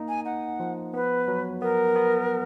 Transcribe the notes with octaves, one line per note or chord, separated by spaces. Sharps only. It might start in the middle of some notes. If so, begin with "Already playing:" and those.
Already playing: A#3 D#4
G#5
D#4 F#5
F3
B3 B4
F#3
B3 A#4
B3